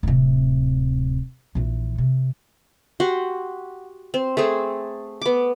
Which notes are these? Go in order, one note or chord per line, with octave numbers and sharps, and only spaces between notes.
D1 C3
A#1 E3
C3
F#4 G4 F#5 C6
C4
A3 C4 G#4 A4
B3 D6